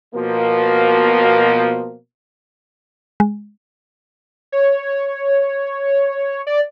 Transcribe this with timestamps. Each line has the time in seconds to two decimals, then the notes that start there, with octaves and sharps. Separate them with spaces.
0.15 B2 F3 A#3
3.20 G#3
4.52 C#5
6.47 D5